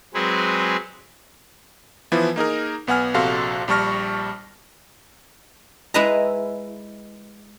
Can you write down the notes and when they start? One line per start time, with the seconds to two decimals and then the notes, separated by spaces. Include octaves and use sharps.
0.14 F#3 G#3 C4 G#4 B4
2.12 E3 F3 B3 E4
2.36 A#3 D#4 G#4 A#4
2.87 B1 B3 F#5 G#5 F6
3.14 A#1 C3 F#4 A4 F5 C6
3.68 A#1 G3 A5 C#6 F6 A#6
5.94 G#3 E4 B4 D#5 E5 A#5